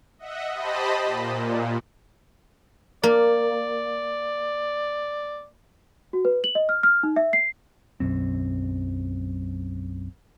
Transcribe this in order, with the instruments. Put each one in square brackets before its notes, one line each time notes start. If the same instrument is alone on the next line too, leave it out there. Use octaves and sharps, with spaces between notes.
[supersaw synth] D#5 E5 F#5
G4 C5 D#5 A5 B5
A#2
[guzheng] A#3 [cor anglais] D5
[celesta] F#4
B4
F#7
D#5
F6
F6
D#4
E5
C7
[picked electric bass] B1 F#2 C4